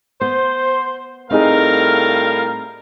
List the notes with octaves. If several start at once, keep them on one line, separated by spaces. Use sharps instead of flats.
B3 C5
A2 G3 C4 D#4 G#4 A#4 F5